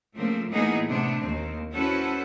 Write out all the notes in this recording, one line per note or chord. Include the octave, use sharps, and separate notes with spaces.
C#3 F3 A3 A#3 C4
A2 E3 A#3 B3 D#4 G#4
C3 A3 B3 D4
D#2 C4
C#4 E4 F#4 A4 B4 C5